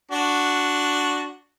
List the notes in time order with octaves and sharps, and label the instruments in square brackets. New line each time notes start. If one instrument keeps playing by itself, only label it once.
[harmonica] D4 F#4